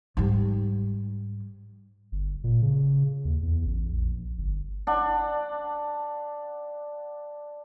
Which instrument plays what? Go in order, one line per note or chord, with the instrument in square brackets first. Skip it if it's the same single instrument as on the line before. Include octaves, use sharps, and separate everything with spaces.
[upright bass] G#2 G3
[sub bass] G1
A#2
C#3
D#2
E2
A1
A#1
G1
[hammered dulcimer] D4 F#5